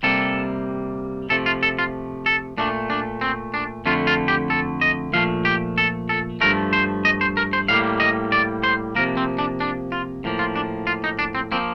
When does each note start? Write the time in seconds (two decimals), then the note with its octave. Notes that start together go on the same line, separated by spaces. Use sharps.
0.03 C3 G3 A#3 A4
1.30 C3 F3 A3 A4
1.46 F4
1.63 A4
1.79 F4
2.26 A4
2.58 A#2 A3 D4
2.90 D4
3.21 C4
3.54 D4
3.86 F2 D3 A3 F4
4.07 F4
4.28 G4
4.50 A4
4.81 D#5
5.13 A#2 F3 A3 F5
5.45 G4
5.78 A4
6.09 A4
6.41 G2 F3 A3 A#4
6.73 C5
7.05 D#5
7.21 C5
7.37 A#4
7.53 C5
7.68 A2 G3 A#3 F5
8.00 D#5
8.32 D5
8.64 C5
8.95 C3 F3 A#3 A#4
9.17 C4
9.39 D4
9.60 D4
9.92 F4
10.24 A2 F3 A#3
10.39 F4
10.56 D4
10.87 F4
11.04 D#4
11.19 D4
11.35 C4
11.52 F3 A#3 C4